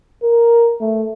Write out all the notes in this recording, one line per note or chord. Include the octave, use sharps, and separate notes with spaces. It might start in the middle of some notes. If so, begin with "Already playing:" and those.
A#4
A3